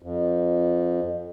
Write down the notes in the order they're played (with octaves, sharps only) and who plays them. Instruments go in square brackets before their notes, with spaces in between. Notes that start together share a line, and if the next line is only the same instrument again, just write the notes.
[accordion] F2